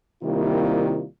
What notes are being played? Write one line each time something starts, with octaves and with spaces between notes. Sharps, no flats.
C3 D#3 G3 A#3 E4 F4